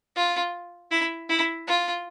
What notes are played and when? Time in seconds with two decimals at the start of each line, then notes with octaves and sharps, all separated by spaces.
0.16 F4
0.91 E4
1.29 E4
1.67 F4